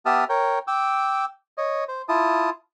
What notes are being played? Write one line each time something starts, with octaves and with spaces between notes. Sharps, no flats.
B3 G4 E5 A5 D#6 F6
A#4 C#5 G5
G5 D6 E6
C#5 D#5
C5
E4 F4 A5 D#6